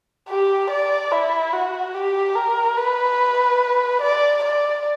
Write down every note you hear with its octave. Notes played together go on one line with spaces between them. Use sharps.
G4
D5
E4
F#4
G4
A#4
B4
D5
D5